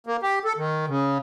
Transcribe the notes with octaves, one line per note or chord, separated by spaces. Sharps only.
A#3
G4
A4
D#3
C#3